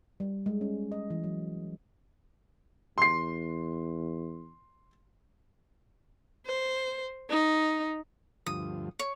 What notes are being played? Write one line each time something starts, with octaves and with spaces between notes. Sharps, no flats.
G3
G#3
C#4
D#5
E3
F#3
E2 C6 C7
C5
D#4
D2 G2 F3 D#6
C#5